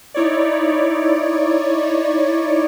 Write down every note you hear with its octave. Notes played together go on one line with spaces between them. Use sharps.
D#4 E4 C#5 D5